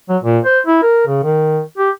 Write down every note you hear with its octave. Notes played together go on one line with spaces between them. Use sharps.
F#3
A#2
C5
E4
A#4
C#3
D#3
G4